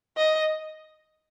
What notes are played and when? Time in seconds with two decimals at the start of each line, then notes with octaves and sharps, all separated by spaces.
0.17 D#5